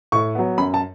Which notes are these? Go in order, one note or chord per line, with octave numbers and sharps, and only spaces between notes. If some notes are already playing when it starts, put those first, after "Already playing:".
A2 C#6
F#3 B3
F#2 B5
A5